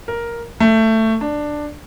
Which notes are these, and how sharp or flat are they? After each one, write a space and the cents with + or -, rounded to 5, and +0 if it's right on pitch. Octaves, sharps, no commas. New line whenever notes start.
A#4 +5
A3 +15
D4 +10